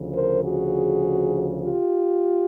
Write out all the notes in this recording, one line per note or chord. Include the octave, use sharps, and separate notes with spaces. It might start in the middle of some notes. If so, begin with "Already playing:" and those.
Already playing: D2 C#3 F3
A#4 C5
F#4 G#4
F4 G4